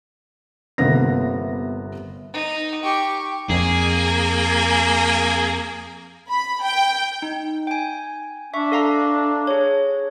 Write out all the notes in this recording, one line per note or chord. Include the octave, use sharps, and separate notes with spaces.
G1 C3 A#3 B3 A#6
D#4
G4 C#6
F2 A#3 G#4
B5
G5
D#4
G5 G#5
D4 E5 C#6
A4 F5 A#5
G#4 C#5